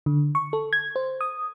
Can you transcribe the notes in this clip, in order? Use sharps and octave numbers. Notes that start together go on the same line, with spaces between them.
D3
C#6
A4
G#6
C5
D#6